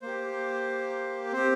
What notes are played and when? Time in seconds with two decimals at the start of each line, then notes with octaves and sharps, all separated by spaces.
0.02 A#3 G4 C5
1.32 C4 G4 C5